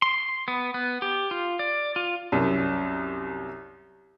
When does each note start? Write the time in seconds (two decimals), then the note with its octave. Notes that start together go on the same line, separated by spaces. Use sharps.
0.02 C6
0.48 B3
0.74 B3
1.02 G4
1.31 F4
1.59 D5
1.96 F4
2.32 C2 F#2